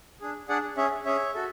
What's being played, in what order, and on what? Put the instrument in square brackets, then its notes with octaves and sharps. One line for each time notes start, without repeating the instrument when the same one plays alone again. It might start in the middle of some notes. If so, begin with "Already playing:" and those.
[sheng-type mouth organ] D4 G#4
D4 G#4 D5 F#5
C#4 G#4 C#5 E5
C#4 G#4 C#5 E5
F#4 A4